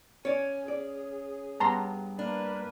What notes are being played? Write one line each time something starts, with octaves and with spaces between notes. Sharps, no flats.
C#4 C#5 D5 G#5
G#4 D5
G2 B3 A5 A#5 C6
A#3 D4 B4